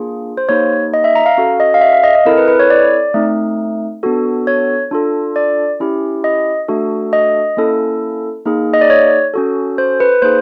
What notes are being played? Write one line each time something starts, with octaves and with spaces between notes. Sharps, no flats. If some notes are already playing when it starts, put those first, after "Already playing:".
Already playing: A#3 D4 F4 G#4
C5
A#3 D#4 G4 C#5
D#5
E5
A#5
F5
C#4 F#4 A4
D#5
F5
E5
F5
D#5
D#5
C4 E4 A4 A#4
B4
B4
C#5
D5
A3 C4 D#4
B3 D4 F#4 A4
C#5
D4 F4 A4
D5
C#4 E4 G4
D#5
A3 D4 F#4 A4
D#5
A#3 C#4 E4 A4
A#3 D#4 G#4
D#5
D5
C#5
C#4 F#4 A4
C5
B4
A#3 D#4 G#4 C5